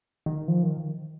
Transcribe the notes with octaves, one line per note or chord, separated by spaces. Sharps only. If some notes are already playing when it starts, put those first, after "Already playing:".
D#3
F3
D#3